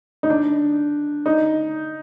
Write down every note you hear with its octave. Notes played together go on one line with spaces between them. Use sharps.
D#4
D4
D#4